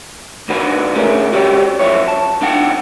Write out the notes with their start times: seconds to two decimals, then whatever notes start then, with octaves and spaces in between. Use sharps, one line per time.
0.48 B1 E2 D#3 D4 F#4 B4
0.95 C#3 G#3 A3 C#4 A#4
1.32 F#4 G4 C#5 D5 F#5 G5
1.79 F3 F#3 C#4 E4 C#5
2.08 A5
2.41 F#2 D4 D#4 F#5 G5